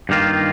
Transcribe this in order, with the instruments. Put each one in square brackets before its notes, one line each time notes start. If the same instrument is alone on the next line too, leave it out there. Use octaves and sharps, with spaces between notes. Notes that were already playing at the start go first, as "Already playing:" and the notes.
[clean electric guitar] G2 D#3 A#3 F4